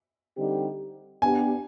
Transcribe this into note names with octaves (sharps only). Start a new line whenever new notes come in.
D3 G3 C4 D#4 G4
B3 D4 G4 G#5